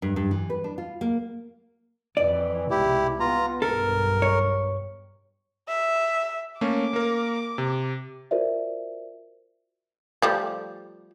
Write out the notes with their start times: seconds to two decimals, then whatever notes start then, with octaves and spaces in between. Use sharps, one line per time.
0.02 G2
0.16 G2
0.31 E3
0.50 B4
0.64 D4
0.78 F4
1.01 A#3
2.17 F2 E3 D5
2.70 C2 G#2 B2 E4 G4
3.20 B3 F4 A#5
3.62 B1 G2 A4 A#4
4.22 C#5
5.68 E5
6.61 A3 A#3 C#4 D6
6.93 A#3 A#4
7.58 C3
8.31 F4 F#4 A#4 C5 D5 E5
10.22 F3 G3 A3